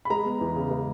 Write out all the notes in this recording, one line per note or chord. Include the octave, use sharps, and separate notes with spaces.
B5
G#3 A#5
B3
E2
C#3
G#3